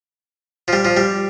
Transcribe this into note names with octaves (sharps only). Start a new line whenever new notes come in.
F3
G3
F3
G3